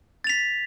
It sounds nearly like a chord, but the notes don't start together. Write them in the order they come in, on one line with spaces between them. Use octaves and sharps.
A6 F7 B6